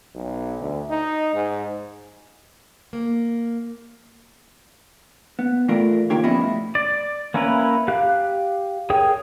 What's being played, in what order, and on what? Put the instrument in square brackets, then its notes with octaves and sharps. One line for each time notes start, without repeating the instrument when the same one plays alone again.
[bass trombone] B1
D2
D#4
G#2
[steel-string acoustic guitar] A#3
[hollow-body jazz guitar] B3
A2 E3 A3 F4 A#4 D5
C#2 D#3 A#3 F4 G4 C#5
F3 G3 B3 C#4 E4 D#5
A2
[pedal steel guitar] D5
A#3 C#4 E4 A#4 B4
G4 F5 F#6
G#4 A#4 C#5 G5 D#6